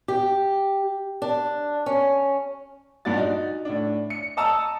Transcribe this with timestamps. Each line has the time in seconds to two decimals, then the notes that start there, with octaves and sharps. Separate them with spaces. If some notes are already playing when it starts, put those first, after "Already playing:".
0.08 G4
1.22 D4
1.86 C#4
3.05 G2 A#2 D4 F#4 A6
3.17 D#4 F#4
3.65 A2 D4
4.10 C#7
4.37 D#5 A5 A#5 E6